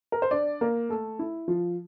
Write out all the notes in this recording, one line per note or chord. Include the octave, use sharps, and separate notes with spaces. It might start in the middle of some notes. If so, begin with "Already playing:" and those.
A#4
C5
D4 D5
A#3 A#4
A3 A4
E4
F3 F4